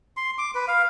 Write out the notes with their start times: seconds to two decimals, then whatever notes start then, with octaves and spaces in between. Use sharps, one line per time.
0.17 C6
0.38 D6
0.55 B4
0.68 F5